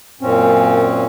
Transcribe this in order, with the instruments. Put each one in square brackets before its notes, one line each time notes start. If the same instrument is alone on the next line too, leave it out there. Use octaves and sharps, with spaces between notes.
[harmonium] F#2 A#2 C4 C#4